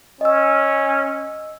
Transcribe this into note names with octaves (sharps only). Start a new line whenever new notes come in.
C#4 D#5 E6